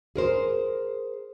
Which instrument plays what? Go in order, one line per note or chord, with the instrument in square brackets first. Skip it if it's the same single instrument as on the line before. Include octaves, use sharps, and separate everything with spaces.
[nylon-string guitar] G#4 A#4 C5